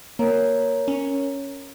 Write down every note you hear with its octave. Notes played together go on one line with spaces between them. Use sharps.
A#3 A#4 C#5 A#5
C#4